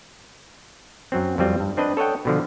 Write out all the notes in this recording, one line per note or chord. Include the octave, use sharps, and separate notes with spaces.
F#2 F#3 C4
F2 F#3 G3 C4 F4
G2
C4 D4 B4 D#5
A4 C#5 D#5 F#5 G5
B2 D3 F3